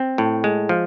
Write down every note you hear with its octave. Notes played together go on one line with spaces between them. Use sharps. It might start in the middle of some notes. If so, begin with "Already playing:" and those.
Already playing: C4
A2
G#3
F3